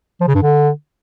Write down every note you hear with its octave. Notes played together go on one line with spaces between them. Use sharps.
F3
C#3
G2
D3